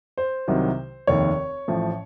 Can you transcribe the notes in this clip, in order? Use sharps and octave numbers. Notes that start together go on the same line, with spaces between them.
C5
C2 C3 D#3 F#3
F1 D#2 D#3 C#5
A1 A2 F3